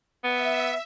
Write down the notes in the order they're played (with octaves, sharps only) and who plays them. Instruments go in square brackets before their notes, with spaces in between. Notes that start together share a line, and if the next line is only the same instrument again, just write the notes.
[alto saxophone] B3 [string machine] E5